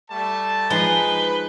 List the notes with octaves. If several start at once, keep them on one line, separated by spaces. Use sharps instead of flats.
G3 A3 A5
F3 G#3 D#4 B4 G7